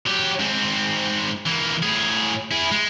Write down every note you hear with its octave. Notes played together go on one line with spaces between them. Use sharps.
F#3 G4
G#2 C4
E3 A#3
A2 G#4
E4 G#4
G#3